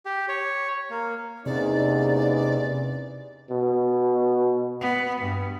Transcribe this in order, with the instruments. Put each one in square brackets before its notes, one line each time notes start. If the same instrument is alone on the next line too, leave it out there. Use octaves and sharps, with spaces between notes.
[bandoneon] G4
C#5
A#3
[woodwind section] E2 [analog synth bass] C3 [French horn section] A#3 C#4 D#4 [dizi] D5
[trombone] B2
[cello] B3
G2